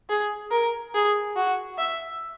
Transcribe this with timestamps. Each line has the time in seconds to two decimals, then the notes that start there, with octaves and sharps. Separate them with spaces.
0.10 G#4
0.51 A#4
0.94 G#4
1.36 F#4
1.78 E5